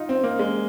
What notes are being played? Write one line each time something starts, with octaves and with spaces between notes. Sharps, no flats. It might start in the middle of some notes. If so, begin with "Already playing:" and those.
Already playing: D#4 F4
C4
A#3
G#3